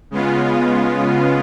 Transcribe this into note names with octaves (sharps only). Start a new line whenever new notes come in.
C#3 G#3 B3 F4